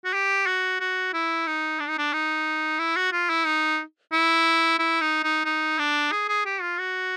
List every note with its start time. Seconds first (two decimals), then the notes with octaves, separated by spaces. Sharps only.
0.05 F#4
0.13 G4
0.46 F#4
0.80 F#4
1.13 E4
1.47 D#4
1.80 D4
1.88 D#4
1.98 D4
2.13 D#4
2.79 E4
2.96 F#4
3.12 F4
3.29 E4
3.46 D#4
4.12 E4
4.79 E4
5.01 D#4
5.23 D#4
5.45 D#4
5.79 D4
6.11 G#4
6.28 G#4
6.45 G4
6.62 F4
6.78 F#4